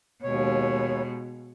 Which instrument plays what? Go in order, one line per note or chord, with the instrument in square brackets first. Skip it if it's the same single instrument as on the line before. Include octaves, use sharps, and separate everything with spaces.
[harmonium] D#2 C#5 [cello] B2 G#3